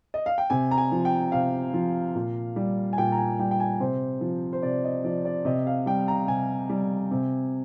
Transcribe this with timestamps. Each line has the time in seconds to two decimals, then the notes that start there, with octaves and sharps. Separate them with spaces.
0.14 D#5
0.26 F5
0.38 G5
0.50 C3 G#5
0.71 A#5
0.78 G#5
0.92 F3
1.05 G5
1.32 C3 F5
1.74 F3
2.15 A#2
2.56 G3
2.93 G#5
2.98 A#2 G5
3.12 A#5
3.18 G#5
3.39 G3 G5
3.51 G5
3.60 G#5
3.80 C3 C5
4.21 F3
4.53 C5
4.63 C3 D5
4.84 D#5
5.04 F3 D5
5.25 D5
5.45 C3 D#5
5.67 F5
5.86 G3 G5
6.08 A#5
6.28 C3 G#5
6.70 G3
7.11 C3